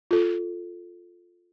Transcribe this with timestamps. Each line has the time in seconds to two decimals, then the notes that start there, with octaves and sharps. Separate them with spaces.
0.11 F4 A4